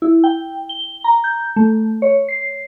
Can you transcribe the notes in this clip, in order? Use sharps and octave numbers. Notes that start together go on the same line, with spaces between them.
E4
G5
G7
A#5
G6
A3
C#5
C7